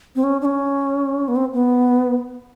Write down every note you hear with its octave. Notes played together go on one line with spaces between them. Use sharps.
C4
C#4
D4
C#4
B3
C4
B3